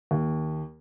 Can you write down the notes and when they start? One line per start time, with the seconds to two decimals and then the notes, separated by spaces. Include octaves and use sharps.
0.11 D#2